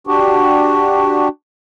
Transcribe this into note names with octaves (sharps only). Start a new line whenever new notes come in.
D4 F#4 G4